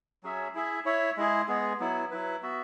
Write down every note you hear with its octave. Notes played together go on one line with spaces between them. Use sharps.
F#3 C#4 G#4 E5
E4 G#4 E5
E4 C#5 E5
G#3 E4 G#4
G#3 B3 G#4
F#3 B3 E4
F#3 E4 B4
B3 F#4 E5